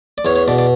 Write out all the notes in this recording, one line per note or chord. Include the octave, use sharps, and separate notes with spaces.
D5
E2 C#5
C#5
B2 D5
D5